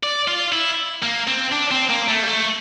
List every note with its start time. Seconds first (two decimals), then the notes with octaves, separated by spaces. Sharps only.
0.03 D5
0.28 F4
0.52 E4
1.02 A#3
1.27 C4
1.52 D4
1.71 C4
1.90 A#3
2.09 A3
2.23 G3
2.27 A3